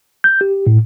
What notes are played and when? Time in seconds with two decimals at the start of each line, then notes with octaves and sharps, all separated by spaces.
0.24 G6
0.41 G4
0.67 A2